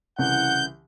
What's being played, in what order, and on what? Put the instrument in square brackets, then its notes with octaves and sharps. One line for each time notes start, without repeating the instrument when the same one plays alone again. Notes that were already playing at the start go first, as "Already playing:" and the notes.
[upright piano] C2 C#3 E3 [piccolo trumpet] F#5 [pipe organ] G6